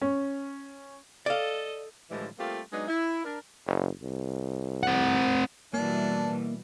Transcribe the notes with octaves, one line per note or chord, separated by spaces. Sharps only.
C#4
A4 D5 D#5 F5
A2 D3 E3 F3 G3 G#3
G3 A3 A#3 C4 F4 G4
F#3 G#3 B3 D4 D#4
E4
D4 A#4
F#1
C2
C4 F#5
B2 E3 G3 A#3 D4